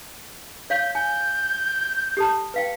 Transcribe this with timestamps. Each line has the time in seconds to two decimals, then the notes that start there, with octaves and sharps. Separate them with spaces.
0.70 C#5 F5 G6
0.95 G#5 G6
2.17 G4 A4 A5
2.54 B4 F5 G5